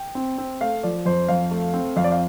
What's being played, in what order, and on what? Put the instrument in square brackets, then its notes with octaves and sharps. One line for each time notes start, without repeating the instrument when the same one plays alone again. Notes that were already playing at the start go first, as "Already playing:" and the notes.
Already playing: [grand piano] G5
C4
C4
A3 F5
F3 D5
F2 C5
F2 F5
A3
C4
F2 F5
D5
F5